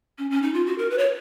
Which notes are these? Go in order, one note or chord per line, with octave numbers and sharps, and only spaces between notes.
C#4
C#4
D#4
F4
F#4
A#4
B4
C#5